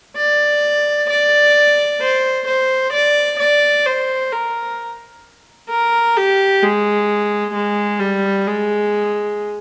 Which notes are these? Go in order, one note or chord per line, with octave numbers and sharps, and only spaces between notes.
D5
D5
C5
C5
D5
D5
C5
A#4
A#4
G4
G#3
G#3
G3
G#3